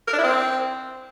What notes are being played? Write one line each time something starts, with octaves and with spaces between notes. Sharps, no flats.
A#4
D4
E4
C4